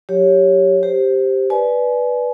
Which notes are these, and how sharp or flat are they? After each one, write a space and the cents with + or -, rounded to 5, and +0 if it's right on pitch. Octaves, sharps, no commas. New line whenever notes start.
F#3 +0 G4 +0 C#5 +0
G4 +0 C5 +0
B4 -10 D5 +0 G#5 +35